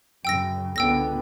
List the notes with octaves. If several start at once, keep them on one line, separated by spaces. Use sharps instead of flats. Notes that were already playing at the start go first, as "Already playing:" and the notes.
F#2 C#3 G5 E6 A#6
C#2 D3 B3 G5 E6 A#6